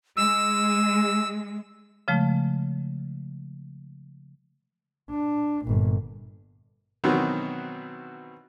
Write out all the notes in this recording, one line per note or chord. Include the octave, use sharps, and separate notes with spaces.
G#3 E6
C#3 F3 G#3 A3
D4
G1 A#2
B2 D#3 E3 F#3 B3 C4